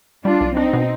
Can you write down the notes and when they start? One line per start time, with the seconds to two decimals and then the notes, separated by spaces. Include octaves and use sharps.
0.24 G3 D4 F4
0.41 B1
0.56 C4 D4 D#4
0.73 B2